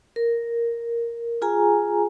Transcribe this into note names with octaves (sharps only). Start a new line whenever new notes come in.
A#4
F4 G#4 G#5 A#5